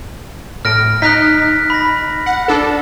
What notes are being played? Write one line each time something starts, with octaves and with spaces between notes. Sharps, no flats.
A2 F6 A#6 D7
D#4 F#6 B6
B5 A#6
F#5
D4 A4